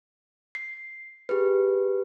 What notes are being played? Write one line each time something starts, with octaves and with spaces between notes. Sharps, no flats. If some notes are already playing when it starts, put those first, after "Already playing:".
C7
G4 G#4 B4